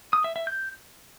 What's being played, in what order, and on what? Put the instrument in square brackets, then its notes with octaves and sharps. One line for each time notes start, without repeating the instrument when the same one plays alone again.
[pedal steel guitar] D#6
E5
E5
G6